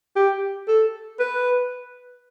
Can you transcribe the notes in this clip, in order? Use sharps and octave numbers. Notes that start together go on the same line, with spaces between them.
G4
A4
B4